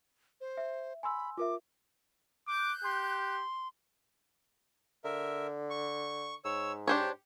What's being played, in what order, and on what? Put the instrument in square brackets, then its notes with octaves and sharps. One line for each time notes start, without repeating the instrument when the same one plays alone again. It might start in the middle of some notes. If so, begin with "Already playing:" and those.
[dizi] C5
[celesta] E5
[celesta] G#5 C6 E6 [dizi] B5
[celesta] F4 A#4 E5 [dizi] D6
[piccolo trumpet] D6 [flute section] F#6 G6
[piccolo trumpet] G4 [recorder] C6
[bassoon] D3 [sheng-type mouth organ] A#4 E5
[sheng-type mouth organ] C#6
[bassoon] G#2 [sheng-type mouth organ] C#5 E6
[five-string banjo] D4 C5 C#5 [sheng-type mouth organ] G4